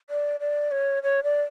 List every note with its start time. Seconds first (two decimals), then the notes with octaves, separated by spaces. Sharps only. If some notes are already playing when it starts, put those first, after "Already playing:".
0.10 D5
0.40 D5
0.71 C#5
1.03 C#5
1.23 D5